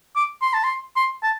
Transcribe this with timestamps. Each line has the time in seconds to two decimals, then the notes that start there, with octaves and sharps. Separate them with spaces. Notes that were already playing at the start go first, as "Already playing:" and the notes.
0.16 D6
0.42 C6
0.54 A5
0.64 C6
0.96 C6
1.23 A5